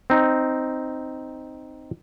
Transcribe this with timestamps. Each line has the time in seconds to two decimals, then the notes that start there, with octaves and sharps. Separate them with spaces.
0.10 C4 D#4